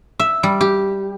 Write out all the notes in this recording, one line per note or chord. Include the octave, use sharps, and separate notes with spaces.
E5
G3
G4